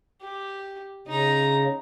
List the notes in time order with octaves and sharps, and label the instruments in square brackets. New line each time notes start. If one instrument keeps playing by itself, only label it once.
[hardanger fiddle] G4
[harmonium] C#3 [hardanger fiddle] D#4 A#5